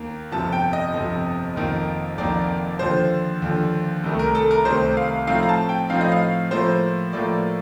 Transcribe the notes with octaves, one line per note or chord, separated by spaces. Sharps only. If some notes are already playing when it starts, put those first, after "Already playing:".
Already playing: D#2 D#3 A#3
G1 F2 C3 A5
G5
D#5
G1 F2 C3
F1 F2 D#3 A#3 D#4
F1 F2 D#3 A#3 D#4 D5
D#2 D3 F3 C5
D#2 D3 F3
C2 C3 D#3 A3
A#4
A4
A#4
C2 C3 D#3 A3 C5
F5
A2 F3 C4 D#4 F5
A#5
A5
G5
A2 F3 C4 D#4 F5
D#5
F5
A2 F3 A#3 C5
A2 F3 A#3 D5